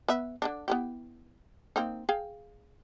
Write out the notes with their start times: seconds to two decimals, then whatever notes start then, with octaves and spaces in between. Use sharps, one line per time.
0.08 B3 B4 E5
0.42 D3 D#3 D4
0.68 B3 E4 G4
1.76 A#3 C4 D#4
2.09 G#4 F5 G5